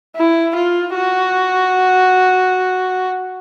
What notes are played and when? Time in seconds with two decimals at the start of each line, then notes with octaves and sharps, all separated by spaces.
0.16 E4
0.55 F4
0.94 F#4